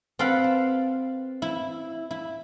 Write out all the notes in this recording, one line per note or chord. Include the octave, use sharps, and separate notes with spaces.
C4 A4 B4 F5 F#5 B5
A5
E4
E4